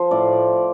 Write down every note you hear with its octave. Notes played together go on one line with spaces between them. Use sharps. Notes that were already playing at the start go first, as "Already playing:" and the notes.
Already playing: F3 C5
A2 D5